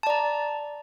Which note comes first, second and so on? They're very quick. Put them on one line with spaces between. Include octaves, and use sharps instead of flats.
A5 D5 A#5